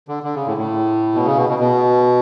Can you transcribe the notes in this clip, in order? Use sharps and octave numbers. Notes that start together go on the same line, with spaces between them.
D3
D3
C#3
A2
A2
B2
C#3
B2
B2
B2